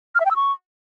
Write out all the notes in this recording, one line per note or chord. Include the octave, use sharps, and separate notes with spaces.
F6
E5
G5
E6
C#6